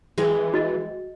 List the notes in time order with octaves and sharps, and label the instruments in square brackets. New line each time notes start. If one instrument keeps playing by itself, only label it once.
[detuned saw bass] E3 [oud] G#3 C4
[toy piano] F#4 D#5